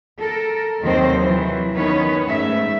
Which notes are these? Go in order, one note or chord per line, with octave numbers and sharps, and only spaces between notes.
A4 A#4
D#2 C3 D#3 F#3 C4 C5
E3 F#3
D#3 B3 C#4 B4 C#5
G#2 A3 E5